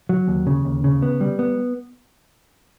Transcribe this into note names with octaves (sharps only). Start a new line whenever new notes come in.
F#3
D#2
C#3
D#2
C#3
B3
G3
B3